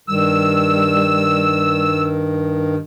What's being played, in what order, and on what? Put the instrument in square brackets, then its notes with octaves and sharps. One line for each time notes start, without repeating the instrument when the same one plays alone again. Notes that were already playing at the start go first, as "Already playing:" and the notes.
[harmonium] G2 D#3 [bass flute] G3 [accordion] E6